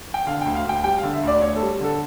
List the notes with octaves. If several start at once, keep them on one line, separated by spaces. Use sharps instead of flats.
G5
D3 F5
D2 G5
F5
D2 G5
G3 G5
D3 F5
E5
D2 D5
D2 C#5
G3 A4
D3 A4